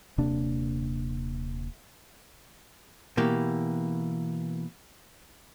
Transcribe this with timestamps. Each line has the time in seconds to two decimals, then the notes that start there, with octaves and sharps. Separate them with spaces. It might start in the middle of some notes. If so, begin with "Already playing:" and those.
0.18 D#1 C3 A#3 D4
3.17 B2 E3 A#3 G4